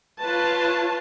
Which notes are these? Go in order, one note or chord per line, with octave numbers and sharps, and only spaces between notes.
F4 B4 C#5 A5